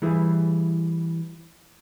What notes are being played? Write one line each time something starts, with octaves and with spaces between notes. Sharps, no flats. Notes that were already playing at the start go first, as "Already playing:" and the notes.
E3 G3 E4 G#4 B4